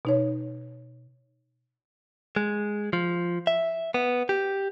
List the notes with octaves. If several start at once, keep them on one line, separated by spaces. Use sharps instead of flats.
B2 D#4 C#5
G#3
F3
E5
B3
G4